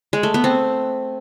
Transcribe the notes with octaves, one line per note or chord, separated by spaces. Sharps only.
G#3
A3
B3
C4